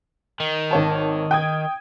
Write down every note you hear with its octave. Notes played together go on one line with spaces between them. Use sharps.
D#3
G#1 C#5 A5
G5 D#6 G#6